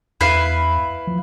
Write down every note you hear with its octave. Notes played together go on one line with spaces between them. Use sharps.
E2 E4 B4 F5
F3